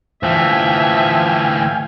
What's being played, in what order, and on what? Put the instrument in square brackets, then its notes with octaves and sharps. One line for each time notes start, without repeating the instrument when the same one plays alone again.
[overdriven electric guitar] D2 E3 [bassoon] F3 [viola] E5 [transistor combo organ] F5 G5 G#5